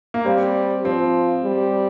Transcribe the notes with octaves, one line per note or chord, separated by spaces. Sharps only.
A#3
G3 C4
F3 C4
G3